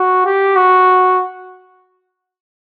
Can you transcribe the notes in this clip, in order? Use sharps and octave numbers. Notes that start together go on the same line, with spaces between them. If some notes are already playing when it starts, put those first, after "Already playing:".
Already playing: F#4
G4
F#4